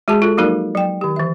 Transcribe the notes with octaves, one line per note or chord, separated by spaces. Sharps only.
G#3 F#4 G#4 A5
F4 A4
F3 F#3 A#3 D#4 F#4 A#4
F#3 G5
D#3 G4
E3 E5